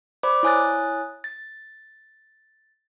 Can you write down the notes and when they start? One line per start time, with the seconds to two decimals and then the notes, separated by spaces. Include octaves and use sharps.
0.23 C5 D5 B5 D6
0.43 E4 C#5 G#5 D#6 F#6 A6
1.24 A6